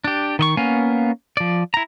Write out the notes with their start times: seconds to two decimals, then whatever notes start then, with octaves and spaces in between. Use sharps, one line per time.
0.04 D4 G4
0.39 D#3 D#5 C#6
0.57 A#3 B3 C#4 F5 G#5
1.37 F3 D5
1.74 E4 A#5